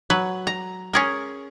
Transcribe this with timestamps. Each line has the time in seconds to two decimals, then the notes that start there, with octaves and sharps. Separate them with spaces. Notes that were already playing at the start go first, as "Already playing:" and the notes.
0.10 F#3 B4
0.47 A#5
0.93 C#4 G#4 A#4